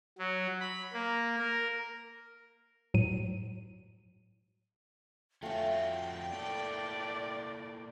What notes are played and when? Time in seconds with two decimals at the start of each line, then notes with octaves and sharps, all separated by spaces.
0.18 F#3
0.61 B5
0.93 A#3
1.38 A#4
2.94 A2 F#3 D#7
5.42 F2 A3 C#4 F4 F#4 G5
6.33 A#3 E4 A4 D5